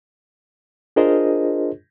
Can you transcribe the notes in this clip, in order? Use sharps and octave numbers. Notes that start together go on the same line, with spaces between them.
D4 F4 G#4 A#4 C5 D#5